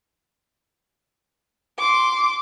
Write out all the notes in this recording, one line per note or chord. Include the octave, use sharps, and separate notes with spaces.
C6 D6